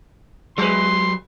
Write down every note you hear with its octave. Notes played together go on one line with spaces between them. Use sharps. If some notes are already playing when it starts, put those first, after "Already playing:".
F#3 G3 B4 C6